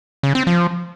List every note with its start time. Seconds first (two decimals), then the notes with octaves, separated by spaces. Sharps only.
0.23 C#3
0.35 C4
0.47 F3